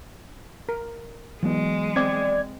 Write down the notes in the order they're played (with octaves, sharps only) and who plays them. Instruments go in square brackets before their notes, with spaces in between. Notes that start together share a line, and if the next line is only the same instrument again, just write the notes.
[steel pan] A#4
[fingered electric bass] E3 F#3 B3 [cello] G#3
[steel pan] C4 [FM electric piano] D5 G#6